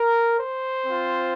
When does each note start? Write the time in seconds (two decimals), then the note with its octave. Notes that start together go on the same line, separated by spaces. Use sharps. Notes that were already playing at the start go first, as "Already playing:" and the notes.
Already playing: A#4
0.39 C5
0.86 C4 F4